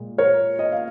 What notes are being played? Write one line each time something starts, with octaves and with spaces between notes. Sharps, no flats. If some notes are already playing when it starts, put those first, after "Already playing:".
Already playing: A#2 G#3
A#4 C#5
D#5
F5